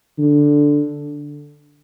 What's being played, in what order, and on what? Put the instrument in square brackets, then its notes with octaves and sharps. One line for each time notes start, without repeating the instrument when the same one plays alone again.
[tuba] D3